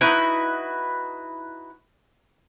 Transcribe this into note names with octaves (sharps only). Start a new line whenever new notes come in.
D#4 E4 F#4 B4